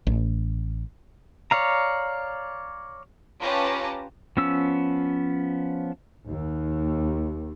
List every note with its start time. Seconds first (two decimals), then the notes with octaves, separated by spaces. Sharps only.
0.07 A1
1.51 C#5 D5 F5 A#5
3.42 C#4 F4 G4 B4 A5 A#5
4.37 F3 B3 C#4 E6
6.30 D#2